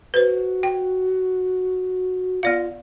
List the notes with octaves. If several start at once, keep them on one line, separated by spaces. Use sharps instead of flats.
F#4 B4 C5
G5
B3 F4 D5 F5